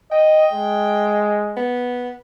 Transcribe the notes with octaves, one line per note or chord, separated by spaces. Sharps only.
D#5 G5
G#3
B3